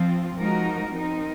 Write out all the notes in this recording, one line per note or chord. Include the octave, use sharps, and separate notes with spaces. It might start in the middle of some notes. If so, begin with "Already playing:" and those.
Already playing: F3 C4 F4
F3 G#3 D#4 F#4 A#4
C4 D#4 A#4